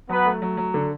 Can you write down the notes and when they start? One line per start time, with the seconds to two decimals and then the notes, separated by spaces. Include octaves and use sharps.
0.09 F#3 B3 B4
0.26 A3
0.42 F#3
0.57 F#3
0.74 D3